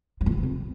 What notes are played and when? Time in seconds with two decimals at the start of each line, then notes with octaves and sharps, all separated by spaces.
0.21 F3
0.26 G2
0.32 F3
0.37 E3
0.43 F2